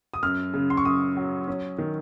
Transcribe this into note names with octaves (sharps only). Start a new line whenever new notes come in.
D#6
F#2 F6
C#3
C6
C#6
F#2 D#6
F#3
C#4
D#3